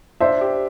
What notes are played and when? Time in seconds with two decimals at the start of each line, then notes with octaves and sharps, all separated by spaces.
0.21 D4 C5 E5
0.41 G4